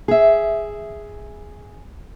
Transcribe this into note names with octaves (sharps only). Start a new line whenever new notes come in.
G#4 E5